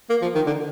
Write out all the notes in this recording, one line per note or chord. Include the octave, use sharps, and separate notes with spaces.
A#3
F3
D#3
D3